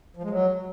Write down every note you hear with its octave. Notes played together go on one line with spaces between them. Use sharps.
F3
G#3
F#3